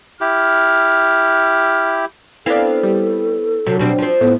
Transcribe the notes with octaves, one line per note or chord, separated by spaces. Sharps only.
E4 G4 F6
B3 C4 D4 E4 A4 F5
G3
C3 F#3 D4
B2 G3 C4 D4
F3 C4
A2 B3